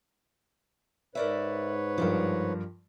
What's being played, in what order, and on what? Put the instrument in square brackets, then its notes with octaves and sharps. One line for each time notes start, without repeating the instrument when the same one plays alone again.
[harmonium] G#2 B4 C#5 [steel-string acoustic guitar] A#4 D5 E5
[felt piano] G2 F3 [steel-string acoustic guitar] D4 A4 A#4